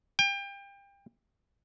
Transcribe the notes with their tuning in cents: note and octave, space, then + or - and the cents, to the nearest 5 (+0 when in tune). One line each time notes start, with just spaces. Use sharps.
G5 +30